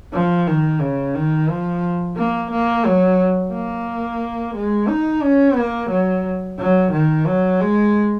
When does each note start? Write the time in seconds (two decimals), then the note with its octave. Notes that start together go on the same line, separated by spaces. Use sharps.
0.13 F3
0.47 D#3
0.80 C#3
1.15 D#3
1.50 F3
2.17 A#3
2.51 A#3
2.86 F#3
3.53 A#3
4.55 G#3
4.88 D#4
5.23 C#4
5.57 A#3
5.90 F#3
6.59 F#3
6.92 D#3
7.27 F#3
7.61 G#3